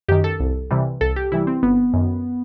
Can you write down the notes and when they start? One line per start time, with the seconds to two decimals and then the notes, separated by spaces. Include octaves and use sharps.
0.08 F#2 D#3 G4
0.24 A4
0.40 C2
0.71 C3 E3 G3
1.01 C2 A4
1.16 G4
1.32 C3 E3 G3 E4
1.47 C4
1.63 G1 B3
1.94 F#2 D#3